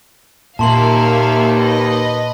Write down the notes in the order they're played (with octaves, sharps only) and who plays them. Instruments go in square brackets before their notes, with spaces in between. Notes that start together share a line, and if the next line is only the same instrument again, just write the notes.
[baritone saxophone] D#2 [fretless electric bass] A#2 [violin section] A#3 E5 F5 [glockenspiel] A5 C6 F#7
[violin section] B4 D#5